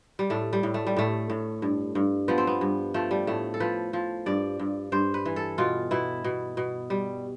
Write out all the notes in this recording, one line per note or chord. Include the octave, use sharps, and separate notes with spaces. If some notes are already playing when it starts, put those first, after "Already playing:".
G3
A2 A3
G3
A2
A3
G3
A2 A3
A2
G2
G2
F3 B3
C4
B3
G2
F3 A3
G3
A2 A3
A4
F3 B4
F3
G2 D5
G2
G2 C5
B4
E3
A4
B2 F4
B2 E4
B2
B2
G3